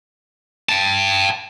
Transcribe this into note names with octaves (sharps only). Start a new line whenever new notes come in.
G5 A5